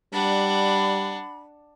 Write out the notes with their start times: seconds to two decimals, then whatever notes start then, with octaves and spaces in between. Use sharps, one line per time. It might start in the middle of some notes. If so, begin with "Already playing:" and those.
0.14 G3 D4 F#5 B5